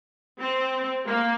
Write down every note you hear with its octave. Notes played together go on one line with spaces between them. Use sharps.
C4
A#3